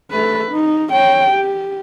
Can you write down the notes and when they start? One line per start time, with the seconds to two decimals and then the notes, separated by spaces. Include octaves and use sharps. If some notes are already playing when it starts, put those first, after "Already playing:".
0.11 A3 B4
0.52 D#4
0.91 C#5 G5
1.31 G4